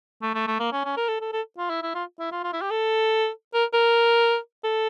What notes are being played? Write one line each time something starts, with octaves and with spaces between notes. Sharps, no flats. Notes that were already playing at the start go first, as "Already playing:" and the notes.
A3
A3
A3
A#3
C#4
C#4
A#4
A4
A4
A4
F4
E4
E4
F4
E4
F4
F4
E4
G4
A4
A#4
A#4
A4